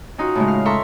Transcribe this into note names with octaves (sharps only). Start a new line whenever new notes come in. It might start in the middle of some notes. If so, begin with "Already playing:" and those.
C#4 D#4 F4 F#4
A2 C#3 G#3
F5
A4 E5 A#5 C6 C#6